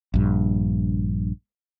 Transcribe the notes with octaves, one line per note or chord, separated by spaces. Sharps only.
A#1 G2